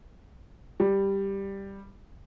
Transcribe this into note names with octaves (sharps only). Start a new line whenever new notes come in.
G3